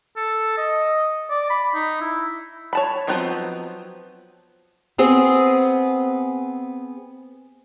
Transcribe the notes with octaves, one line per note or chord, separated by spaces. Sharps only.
A4
D#5
D5
B5
D#4
E4
C#5 A5 B5
F3 F#3 B3 C4 D#4
B3 C4 G#4